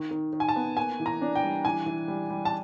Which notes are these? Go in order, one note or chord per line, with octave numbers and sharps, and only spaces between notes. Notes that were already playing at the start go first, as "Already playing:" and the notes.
Already playing: D#3
D#3
D#3
G#5
A5
B3
A#3 G#5
E3
A#5
D4
G5
G3
E3 G#5
E3
G3
G3
A5